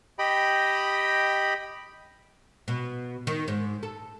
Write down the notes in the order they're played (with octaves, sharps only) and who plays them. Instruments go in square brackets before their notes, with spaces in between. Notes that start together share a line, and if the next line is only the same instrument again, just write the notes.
[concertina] G4 D#5 G5 B5
[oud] B2
D#3
G#2
A4